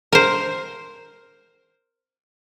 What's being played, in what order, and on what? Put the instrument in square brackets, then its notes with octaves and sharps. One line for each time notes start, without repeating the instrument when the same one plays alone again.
[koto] A#4 C5